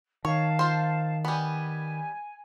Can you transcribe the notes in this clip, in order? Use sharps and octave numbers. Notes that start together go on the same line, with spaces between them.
D#3 C#5 F5 A5
F4 C5
G3 B3 G#5